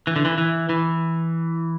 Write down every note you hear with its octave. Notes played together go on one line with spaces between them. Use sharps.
E3
D3
E3
E3
E3